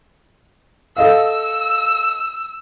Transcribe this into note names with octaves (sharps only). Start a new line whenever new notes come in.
A4 D#5 F5 E6